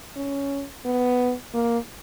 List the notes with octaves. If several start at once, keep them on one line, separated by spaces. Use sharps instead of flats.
C#4
B3
A#3